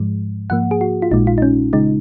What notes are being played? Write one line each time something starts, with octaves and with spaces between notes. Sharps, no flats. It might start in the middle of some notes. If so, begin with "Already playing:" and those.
Already playing: G#2 F3 G#3
G#2 F3 A#3 F#5
G#4
F#4
F4
A#1 A#2 G#3 D#4
F4
D#4
C#4
C#3 G#3 D#4